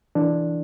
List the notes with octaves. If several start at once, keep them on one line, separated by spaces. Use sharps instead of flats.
E3 D4